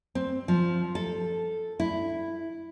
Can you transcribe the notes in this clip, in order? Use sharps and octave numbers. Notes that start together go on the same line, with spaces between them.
C4
F3
A4
E4